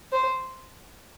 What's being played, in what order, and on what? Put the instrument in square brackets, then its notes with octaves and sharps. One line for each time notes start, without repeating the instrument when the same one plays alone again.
[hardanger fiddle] C5